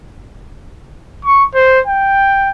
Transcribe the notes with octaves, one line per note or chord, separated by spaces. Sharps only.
C#6
C5
G5